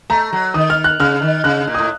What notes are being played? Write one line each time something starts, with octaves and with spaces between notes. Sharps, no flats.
A3 A#5
F#3
D#3 D#6
F6
F#6
C#3 F6
D#3
C#3 F#6
A#2
A2 D#6